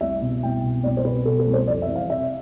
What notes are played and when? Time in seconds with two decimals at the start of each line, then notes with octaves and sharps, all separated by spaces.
0.01 C2 E5
0.21 B2
0.43 C2 G5
0.63 B2
0.84 C2 D5
0.97 C5
1.05 B2 B4
1.25 B2 A4
1.39 A4
1.47 C2
1.53 C5
1.67 F2 D5
1.82 E5
1.89 E3
1.96 F5
2.09 C3 E5